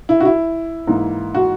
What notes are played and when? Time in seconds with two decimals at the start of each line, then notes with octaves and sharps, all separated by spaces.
0.09 E4
0.20 F#4
0.25 E4
0.87 G#2 E3 A#3
1.35 F#4